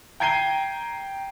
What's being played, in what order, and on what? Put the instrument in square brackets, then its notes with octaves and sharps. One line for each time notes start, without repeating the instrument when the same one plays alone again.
[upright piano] G5 A#5 G#6 C7 D#7 G7